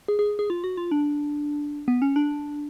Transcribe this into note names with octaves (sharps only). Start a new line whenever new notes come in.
G#4
G#4
G#4
F4
F#4
F4
D4
B3
C#4
D4